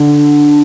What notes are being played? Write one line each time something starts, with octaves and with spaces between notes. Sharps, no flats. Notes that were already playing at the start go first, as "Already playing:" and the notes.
Already playing: D3